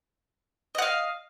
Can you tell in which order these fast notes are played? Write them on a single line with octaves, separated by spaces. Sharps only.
D#5 F#5 F5